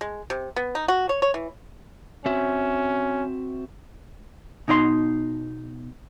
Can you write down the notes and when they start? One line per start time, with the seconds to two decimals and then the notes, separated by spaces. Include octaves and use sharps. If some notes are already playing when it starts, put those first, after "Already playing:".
0.01 G#3
0.30 C3
0.56 B3
0.75 D#4
0.88 F#4
1.09 C#5
1.22 C#5
1.34 E3
2.26 C4 C#4 F#4 E5
4.68 B2 D#4 D5 C6